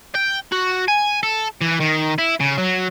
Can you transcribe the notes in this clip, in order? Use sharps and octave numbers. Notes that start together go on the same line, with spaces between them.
G5
F#4
G#5
A4
E3
D#3
E4
C#3
F#3